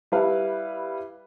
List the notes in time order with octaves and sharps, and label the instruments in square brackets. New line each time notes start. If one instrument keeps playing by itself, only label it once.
[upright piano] G3 E4 B4 F5